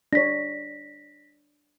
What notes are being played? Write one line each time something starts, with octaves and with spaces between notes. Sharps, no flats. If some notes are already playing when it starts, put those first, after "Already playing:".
D4 C#5 A#6 B6